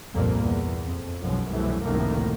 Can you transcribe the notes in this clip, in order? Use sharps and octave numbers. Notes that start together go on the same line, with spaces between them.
G1 C2 F2 A#2 A#3
E2
F2
B1 F#2 B2 F3 G#3
C2 F#2 E3 A3
F1 C#2 A2 D#3 A3 A#3